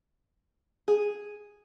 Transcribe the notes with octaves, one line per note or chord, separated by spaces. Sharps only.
G#4